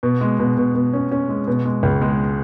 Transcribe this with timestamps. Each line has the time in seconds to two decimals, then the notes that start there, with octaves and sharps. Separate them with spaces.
0.03 B2
0.21 G#3
0.39 B2
0.57 B2
0.75 B2
0.93 C#4
1.11 C#4
1.29 G#3
1.47 B2
1.65 G#3
1.83 C#2
2.01 G#3